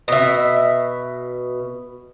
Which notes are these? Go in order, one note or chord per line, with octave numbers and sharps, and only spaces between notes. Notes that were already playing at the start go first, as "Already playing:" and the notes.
B2 E5